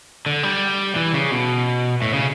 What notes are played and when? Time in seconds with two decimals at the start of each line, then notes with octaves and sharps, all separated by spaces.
0.26 D3
0.43 G3
0.96 E3
1.14 C#3
1.31 B2
2.02 A2
2.14 C#3